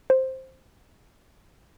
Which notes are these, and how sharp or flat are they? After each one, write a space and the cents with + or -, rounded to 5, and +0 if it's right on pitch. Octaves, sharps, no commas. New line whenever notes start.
C5 +5